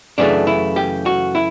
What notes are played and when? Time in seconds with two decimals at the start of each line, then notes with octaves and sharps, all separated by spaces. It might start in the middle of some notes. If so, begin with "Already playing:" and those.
0.18 F#2 C#3 E3 A3 D4
0.47 E4
0.76 G4
1.06 F#4
1.35 E4